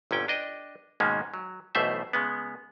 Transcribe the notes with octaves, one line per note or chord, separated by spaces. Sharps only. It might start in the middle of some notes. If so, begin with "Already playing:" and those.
G1 A#2 C#4 G5
D4 D#5 G5
G#2 B2 D#3 G#3 A#3 C#4
F#3
B1 B2 E3 A3 C5 E5
C#3 G#3 B3